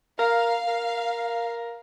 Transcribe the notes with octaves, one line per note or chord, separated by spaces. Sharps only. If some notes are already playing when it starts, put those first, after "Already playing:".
A#4 F5
A#4